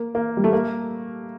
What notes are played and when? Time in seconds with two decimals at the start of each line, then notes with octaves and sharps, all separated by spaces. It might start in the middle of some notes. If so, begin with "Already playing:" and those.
Already playing: A#3
0.15 A#3
0.37 G3
0.44 A3
0.53 A#3